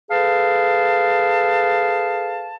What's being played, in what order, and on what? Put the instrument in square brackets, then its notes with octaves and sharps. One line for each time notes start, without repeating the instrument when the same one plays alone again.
[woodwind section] G#4 A4 B4 F5 A5